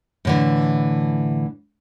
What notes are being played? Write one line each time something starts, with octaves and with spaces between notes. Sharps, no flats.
A2 D3 E3